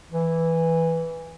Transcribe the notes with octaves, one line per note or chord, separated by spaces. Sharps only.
E3